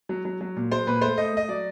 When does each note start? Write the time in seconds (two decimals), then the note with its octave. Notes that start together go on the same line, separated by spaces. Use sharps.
0.09 F#3
0.25 F#3
0.41 F#3
0.56 A#2
0.71 F#3 C5
0.87 A#2 B4
1.01 A3 C5
1.17 A3 D#5
1.33 A3 D#5
1.48 F#3 D5